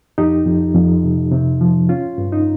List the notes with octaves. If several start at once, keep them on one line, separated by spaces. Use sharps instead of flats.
F2 D#4 G4
F2
F2
C3
C3
F3
C#4 F4
G2
D#4